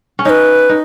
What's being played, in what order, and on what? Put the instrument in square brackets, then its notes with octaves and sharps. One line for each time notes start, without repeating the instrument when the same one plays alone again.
[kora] C#4
[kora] D#4 [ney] B4 C#5
[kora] D#4